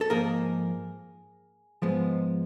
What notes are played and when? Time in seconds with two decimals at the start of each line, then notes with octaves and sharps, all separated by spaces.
0.01 A4
0.10 G#2 F3 A#3 G#4 A#4
1.82 G#2 F3 G#3 B3